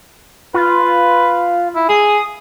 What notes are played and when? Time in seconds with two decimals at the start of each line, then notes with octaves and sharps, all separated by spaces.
0.54 F4 B4
1.75 E4
1.89 G#4 D#6